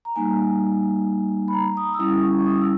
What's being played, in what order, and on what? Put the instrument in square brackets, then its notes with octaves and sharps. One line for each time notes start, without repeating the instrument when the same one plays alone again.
[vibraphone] A#5
G3 A#3 D#4 G#5
B5
A#5
D#6
E6
G3 C#4 E4 D#6
C#6
C#6
D#6
E6